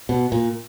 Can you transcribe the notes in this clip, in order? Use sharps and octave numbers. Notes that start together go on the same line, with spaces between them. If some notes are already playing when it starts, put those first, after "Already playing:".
B2
A#2